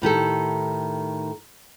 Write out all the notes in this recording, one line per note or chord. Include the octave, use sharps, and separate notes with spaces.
A2 D#3 G4 A4